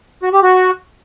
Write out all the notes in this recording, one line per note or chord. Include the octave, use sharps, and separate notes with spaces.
F#4
G4
F#4